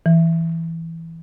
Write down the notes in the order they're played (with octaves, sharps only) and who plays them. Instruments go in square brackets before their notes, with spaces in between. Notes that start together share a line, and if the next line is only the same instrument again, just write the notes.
[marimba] E3